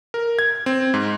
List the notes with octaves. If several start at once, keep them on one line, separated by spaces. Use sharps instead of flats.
A#4
G#6
C4
G#2